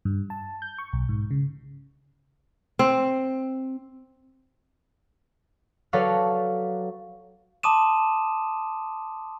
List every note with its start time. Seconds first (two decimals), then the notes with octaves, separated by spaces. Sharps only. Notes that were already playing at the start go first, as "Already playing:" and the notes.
0.05 G2
0.30 A5
0.62 G6
0.78 C#6
0.93 B1
1.09 G#2
1.31 C#3
2.79 C4
5.93 F#3 A4 B4 C#5 D5 F5
7.63 A5 C6 D6 D#6 D#7 E7